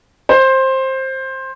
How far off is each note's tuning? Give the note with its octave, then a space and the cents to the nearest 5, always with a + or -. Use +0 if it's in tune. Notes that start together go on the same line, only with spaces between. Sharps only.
C5 +15